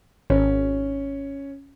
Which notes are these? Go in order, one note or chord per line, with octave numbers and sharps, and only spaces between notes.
G#1 C#4